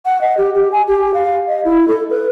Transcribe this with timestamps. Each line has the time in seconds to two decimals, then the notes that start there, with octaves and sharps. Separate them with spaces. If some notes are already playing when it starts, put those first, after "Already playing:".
0.05 F#5
0.21 D#5
0.37 G4
0.55 G4
0.72 G#5
0.88 G4
1.14 F5
1.48 D#5
1.65 E4
1.88 A4
2.10 B4